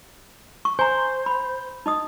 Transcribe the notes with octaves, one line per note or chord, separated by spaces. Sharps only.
C#6
C5 G#5 A#5
B5
D#4 D#5 D#6